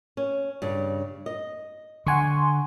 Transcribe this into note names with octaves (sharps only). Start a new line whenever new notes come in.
C#4
G2 C#3
D#5
D3 F#5 G#5 C6 C#6